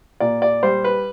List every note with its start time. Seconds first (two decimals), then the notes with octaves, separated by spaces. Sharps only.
0.20 A#2 D5
0.42 D5
0.63 G3 C5
0.84 B4